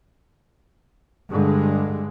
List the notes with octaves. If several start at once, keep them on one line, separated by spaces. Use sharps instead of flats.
G2 D3 G#3